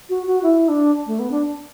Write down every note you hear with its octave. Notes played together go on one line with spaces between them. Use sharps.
F#4
F#4
E4
D4
A3
B3
D4